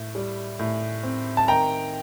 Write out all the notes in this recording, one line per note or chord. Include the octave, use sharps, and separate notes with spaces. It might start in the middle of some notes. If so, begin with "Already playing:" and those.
Already playing: A2
G3
A2
C4
A5
D#3 G5 A#5